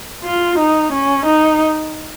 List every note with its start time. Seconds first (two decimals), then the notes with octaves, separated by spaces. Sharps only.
0.24 F4
0.58 D#4
0.92 C#4
1.25 D#4